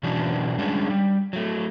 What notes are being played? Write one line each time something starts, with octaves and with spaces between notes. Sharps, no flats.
B2 E3 F#3 C#4 D4
G3 G#3 C#4 D4
G3
F#3 A3